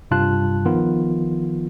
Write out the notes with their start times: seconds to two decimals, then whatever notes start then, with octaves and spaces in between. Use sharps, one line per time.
0.11 G2 C3 G3 F4 A5 F#6
0.65 D#3 F3 B3 F4